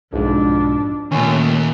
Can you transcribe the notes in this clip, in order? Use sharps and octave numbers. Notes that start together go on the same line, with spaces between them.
B1 F2 G#2 D4
D#2 A#2 A3 C#4